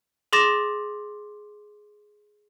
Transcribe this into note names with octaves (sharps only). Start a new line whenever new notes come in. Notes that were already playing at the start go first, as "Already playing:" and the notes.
G#4 C6 D6 A6 A#6 E7